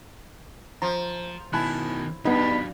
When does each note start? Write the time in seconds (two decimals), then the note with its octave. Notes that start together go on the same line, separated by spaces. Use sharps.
0.82 F3 A#5
1.53 B2 D#3 E4 G#5 A5 F#6
2.25 G2 F#3 B3 D4 D#4 B5